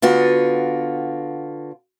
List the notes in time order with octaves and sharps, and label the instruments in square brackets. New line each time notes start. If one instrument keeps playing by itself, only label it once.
[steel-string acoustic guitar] D3 B3 F4 F#4